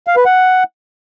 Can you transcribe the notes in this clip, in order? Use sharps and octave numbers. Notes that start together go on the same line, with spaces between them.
F5
B4
F#5